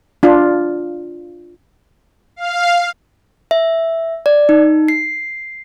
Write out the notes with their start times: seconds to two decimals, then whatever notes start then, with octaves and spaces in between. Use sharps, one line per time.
0.23 D4 F4
2.36 F5
3.51 E5
4.26 D5
4.49 D#4
4.88 C7